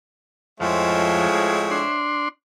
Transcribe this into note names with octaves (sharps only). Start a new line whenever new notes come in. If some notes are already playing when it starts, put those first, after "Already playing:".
F2 A2 F3 G#3 C4 C#5 E5
D4 C6